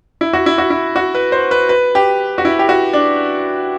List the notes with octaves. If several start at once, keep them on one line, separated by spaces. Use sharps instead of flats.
E4
F#4
E4
F#4
E4
F#4
B4
C5
B4
B4
G4
F#4
E4
G4
F#4
D4